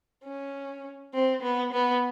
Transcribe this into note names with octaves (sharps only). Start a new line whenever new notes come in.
C#4
C4
B3
B3